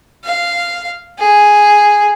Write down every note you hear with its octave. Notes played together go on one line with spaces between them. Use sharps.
F5
G#4